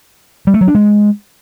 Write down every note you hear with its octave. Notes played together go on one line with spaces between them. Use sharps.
G3
A3
F#3
D4
G#3